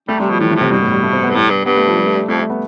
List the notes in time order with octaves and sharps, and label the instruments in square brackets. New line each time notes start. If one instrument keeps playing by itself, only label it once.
[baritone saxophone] G3 [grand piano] A3
[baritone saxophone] C3 [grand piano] G3
[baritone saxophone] B2 [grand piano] F3
[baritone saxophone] A2 [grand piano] E3
[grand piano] E3
[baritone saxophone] A2
[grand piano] C3
[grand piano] G2 [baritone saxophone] B2
[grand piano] A2
G3
A3
C4
B3
[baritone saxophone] G2
[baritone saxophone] A2 [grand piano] G3
[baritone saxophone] G2
[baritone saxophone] G2 [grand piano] B3
[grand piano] A3
F3
G3
A3
G3
[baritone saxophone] F2 [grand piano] A3
[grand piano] A3
B3